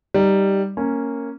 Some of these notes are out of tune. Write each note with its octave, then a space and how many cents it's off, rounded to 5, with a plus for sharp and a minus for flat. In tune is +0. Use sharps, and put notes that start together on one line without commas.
G3 +0 D#4 +0
A#3 -10 C#4 -5